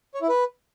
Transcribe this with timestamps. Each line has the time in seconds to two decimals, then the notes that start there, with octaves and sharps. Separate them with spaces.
0.14 C#5
0.21 E4
0.29 B4